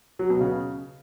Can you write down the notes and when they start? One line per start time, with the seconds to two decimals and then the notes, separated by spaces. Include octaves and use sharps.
0.19 F#3
0.30 B2
0.41 C#3